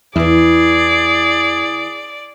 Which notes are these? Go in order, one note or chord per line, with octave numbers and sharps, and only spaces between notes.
E2 E3 E4 G#4 D5